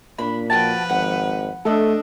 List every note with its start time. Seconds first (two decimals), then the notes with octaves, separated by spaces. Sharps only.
0.19 A#2 D4 B5
0.50 F3 F#4 B4 G5 A5
0.89 G#1 F#5
1.65 A3 D4 A4 D#5